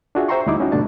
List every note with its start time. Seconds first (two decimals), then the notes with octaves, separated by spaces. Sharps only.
0.15 D4 F4 F#4 G#4 E5
0.28 C5 E5 G5 A#5 C6 C#6
0.46 D2 G3 D#4 E4 D6
0.60 C#4 D#4 F#4
0.72 G2 B2 D3 A3 D4 A5